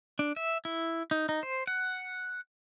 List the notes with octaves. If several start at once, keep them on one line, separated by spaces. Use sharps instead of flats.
D4
E5
E4
D#4
D#4
C5
F#5